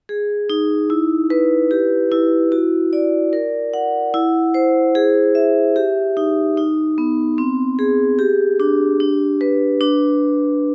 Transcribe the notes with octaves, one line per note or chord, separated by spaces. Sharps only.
G#4
D#4
E4
B4
G4
E4
F#4
D5
A#4
F#5
E4
C5
G#4
E5
G4
D#4
D#4
B3
C4
G#4
G4
D4
D4
B4
D4